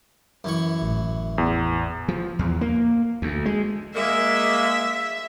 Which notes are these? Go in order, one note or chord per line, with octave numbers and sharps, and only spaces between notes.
F#2 E3 C#6
G#1 A2
E2
F3
E2
A#3
D2
G#3
G#3 A#3 E5